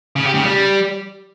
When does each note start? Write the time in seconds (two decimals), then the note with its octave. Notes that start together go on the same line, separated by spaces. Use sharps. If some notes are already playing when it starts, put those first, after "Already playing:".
0.16 C#3
0.25 G4
0.35 C#3
0.44 G3